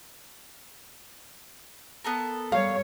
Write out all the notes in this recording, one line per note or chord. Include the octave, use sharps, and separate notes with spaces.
B3 A4 A#4
G3 C#5 F5